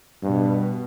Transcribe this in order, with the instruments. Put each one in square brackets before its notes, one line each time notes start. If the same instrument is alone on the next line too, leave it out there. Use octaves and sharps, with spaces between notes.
[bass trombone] G2 [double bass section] B2